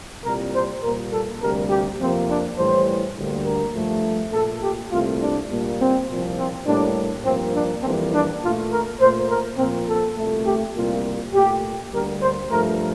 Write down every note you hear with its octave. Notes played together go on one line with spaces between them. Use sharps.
C2 A#2 G3 A#4
C5
A#2 G3 A#3 A#4
A4
D2 C3 G3 A#3 A#4
G4
F2 C3 F3 A#3 C4
D4
A2 E3 G3 C5
D2 D3 G3 A#3
A#4
G2 F3 A3
A#2 A3 A4
G4
C2 A#2 A3 F4
D4
A#2 G3 A#3
C4
C2 A#2 F3
C4
A2 G3 A#3 D4
G2 F3 A#3 C4
D4
F2 E3 G3 A#3 C4
D4
A#2 A3 F4
A#4
A#2 A3 C5
A#4
A#2 F3 A#3 C4
A4
C2 A#2 A3
G4
C2 A#2 G3 A#3 F4
A#2 A3 G4
D2 D3 G3 A#3 A#4
C5
G2 F3 A3 A#4